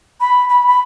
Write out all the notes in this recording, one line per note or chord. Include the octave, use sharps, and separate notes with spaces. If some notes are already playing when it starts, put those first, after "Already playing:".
B5
B5
B5